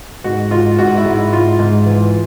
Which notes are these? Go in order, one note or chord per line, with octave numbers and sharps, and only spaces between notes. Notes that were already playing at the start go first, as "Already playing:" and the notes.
G#2 F#4
G#2 F4
G#2 F#4
E4
G#2
E4
G#2 F4
G#2
E3